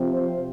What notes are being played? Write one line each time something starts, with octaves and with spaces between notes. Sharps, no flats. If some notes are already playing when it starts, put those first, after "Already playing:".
Already playing: C3 F3 C4
C5